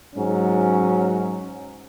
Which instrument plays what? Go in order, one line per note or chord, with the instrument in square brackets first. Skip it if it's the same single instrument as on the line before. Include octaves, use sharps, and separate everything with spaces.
[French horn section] G#2 F#3 C#4